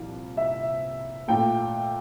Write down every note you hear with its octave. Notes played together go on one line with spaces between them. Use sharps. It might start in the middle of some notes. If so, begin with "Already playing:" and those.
Already playing: C2 A#2 F3
E5
A#2 A3 G5